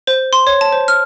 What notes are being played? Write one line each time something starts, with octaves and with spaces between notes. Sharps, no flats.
C5
C6
C#5
A5
C5
F6